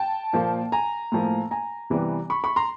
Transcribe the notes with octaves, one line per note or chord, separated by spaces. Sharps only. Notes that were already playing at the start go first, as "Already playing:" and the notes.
Already playing: G5 A5
A#2 F3 A#3
G#5 A#5
A2 F3 A#3
G#5 A#5
C3 E3 G3 B3
B5 C#6
B5 C#6
A#5 C6